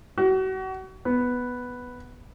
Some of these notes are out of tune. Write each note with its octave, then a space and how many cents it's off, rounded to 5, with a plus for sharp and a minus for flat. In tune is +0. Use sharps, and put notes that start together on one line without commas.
F#4 +35
B3 +0